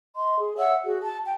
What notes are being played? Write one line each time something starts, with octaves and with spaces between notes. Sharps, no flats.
D#5 C6
G#4
C#5 E5 F#5 E6
F#4 G#4
A5
G5